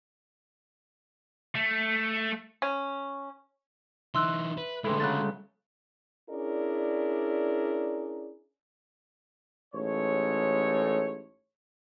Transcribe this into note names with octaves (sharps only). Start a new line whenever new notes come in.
A3
C#4
E3 D#4 E5 C6 E6 F#6
B4
A2 D3 E3 G#3 E4 A4 C6
C#3 F#3 A3 F#6 A6
C#4 D4 E4 G#4 A#4 D5
A1 G#2 A4 C#5